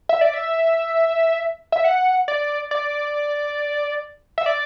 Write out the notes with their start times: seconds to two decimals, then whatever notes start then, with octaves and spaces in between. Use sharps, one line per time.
0.09 E5
0.21 D5
0.34 E5
1.72 E5
1.84 F#5
2.28 D5
2.71 D5
4.38 E5
4.46 D5